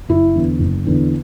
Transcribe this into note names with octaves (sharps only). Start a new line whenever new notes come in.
F#1 E4
E2 D3
F#1
E2 D3